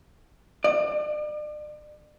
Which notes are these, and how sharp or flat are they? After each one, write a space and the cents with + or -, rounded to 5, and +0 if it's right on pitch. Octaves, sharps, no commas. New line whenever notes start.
D5 +40